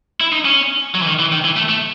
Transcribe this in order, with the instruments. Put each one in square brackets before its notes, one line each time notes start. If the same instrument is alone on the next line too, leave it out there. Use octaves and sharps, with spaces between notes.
[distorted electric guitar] E4
D#4
C#4
F#3
E3
D#3
E3
D#3
E3
A3
A3